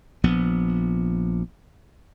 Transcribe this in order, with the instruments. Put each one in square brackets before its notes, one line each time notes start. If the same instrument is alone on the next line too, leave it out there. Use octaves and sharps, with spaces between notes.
[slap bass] A#1 F3 B3